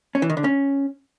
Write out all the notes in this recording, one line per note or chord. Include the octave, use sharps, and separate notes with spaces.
C#4
E3
D#3
D3
C#4